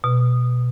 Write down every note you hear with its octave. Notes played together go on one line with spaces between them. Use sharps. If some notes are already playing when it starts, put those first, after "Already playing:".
B2